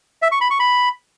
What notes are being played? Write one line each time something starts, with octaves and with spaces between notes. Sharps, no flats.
E5
C#6
B5
C#6
B5